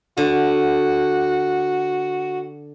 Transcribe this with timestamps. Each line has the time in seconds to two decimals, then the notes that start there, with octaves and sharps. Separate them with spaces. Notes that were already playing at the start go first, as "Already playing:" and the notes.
0.17 D3 F#4